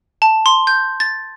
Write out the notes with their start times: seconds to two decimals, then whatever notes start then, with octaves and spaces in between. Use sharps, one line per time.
0.22 A5
0.46 C6
0.67 G6
1.00 A6